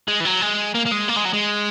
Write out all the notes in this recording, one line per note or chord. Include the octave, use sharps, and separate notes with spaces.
G#3
E3
F#3
G#3
A#3
A#3
G#3
A#3
G#3
F#3
G#3